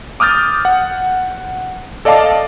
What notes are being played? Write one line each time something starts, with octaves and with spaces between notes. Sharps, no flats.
D6 D#6 F6 G6 A6
F#5
A4 D5 D#5 F5 A5 D6